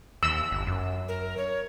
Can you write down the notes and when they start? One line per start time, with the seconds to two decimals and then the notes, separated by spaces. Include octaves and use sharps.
0.23 D#2 E6
0.51 G1
0.67 F#2
1.08 A#4
1.37 C#5